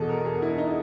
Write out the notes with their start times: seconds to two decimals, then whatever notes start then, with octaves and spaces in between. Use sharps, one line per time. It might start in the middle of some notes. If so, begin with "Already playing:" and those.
Already playing: E2 B2 G#4 A4
0.09 A#4
0.25 G#4
0.42 E4
0.58 D#4